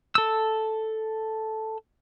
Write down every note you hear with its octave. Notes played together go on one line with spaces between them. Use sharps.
A4 E6